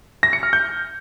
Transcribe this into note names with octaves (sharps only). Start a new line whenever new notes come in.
A#6
C#7
F6
G6